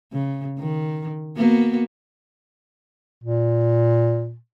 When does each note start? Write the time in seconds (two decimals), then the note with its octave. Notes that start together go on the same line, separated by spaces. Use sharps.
0.12 C#3
0.59 D#3
1.37 A#3 B3 F#4
3.24 A#2